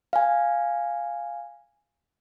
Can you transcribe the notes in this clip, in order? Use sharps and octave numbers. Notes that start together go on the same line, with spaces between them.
F5 G#5